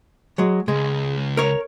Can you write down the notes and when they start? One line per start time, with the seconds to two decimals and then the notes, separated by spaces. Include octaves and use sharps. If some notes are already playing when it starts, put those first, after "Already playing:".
0.38 F#3 G#3
0.68 C#2 G#3
1.37 A#4 C#5